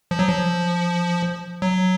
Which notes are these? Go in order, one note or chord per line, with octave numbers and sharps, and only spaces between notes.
F3
F#3
F3
F#3